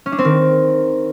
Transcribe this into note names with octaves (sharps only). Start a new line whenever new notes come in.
C#4
D4
C4
D#3